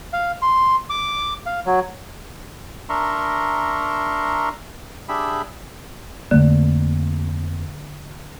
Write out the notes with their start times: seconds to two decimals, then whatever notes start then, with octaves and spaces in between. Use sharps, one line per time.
0.13 F5
0.42 C6
0.90 D6
1.46 F5
1.66 F#3
2.89 D4 A#4 E5 A#5 C6 C#6
5.09 D4 G4 G#4 E5 B5
6.31 F2 D3 A3 A#3